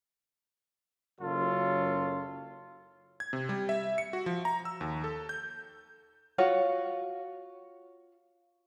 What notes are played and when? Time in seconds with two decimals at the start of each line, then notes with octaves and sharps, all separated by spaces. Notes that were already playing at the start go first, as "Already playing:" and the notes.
1.20 F#1 F#2 C#3 F4 A4 C#5
3.20 G#6
3.33 C3
3.49 G3
3.69 E5
3.98 C#7
4.13 F#4
4.26 F3
4.45 A#5
4.65 E6
4.81 D#2
5.04 A4
5.29 G6
6.38 F4 F#4 C#5